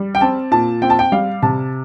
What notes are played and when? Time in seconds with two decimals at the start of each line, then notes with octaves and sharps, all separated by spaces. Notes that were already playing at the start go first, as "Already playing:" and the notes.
Already playing: G3
0.15 G5
0.21 C4 A5
0.51 A#2 A5
0.82 C4 G5
0.90 A5
0.99 G5
1.12 G3 F5
1.43 C3 A5